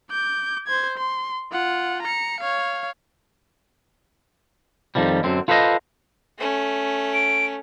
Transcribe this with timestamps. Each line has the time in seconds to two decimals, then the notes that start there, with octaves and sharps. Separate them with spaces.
0.11 D6 G6
0.67 C5 G#6
0.97 C6
1.52 F4 F#5
2.02 A#5 C#7
2.40 C#5 F5
4.95 F2 D#3 F3 G3
5.24 F#2 D3 C4
5.48 F4 A4 B4 C5 D5 D#5
6.38 A3 C#4
7.14 D7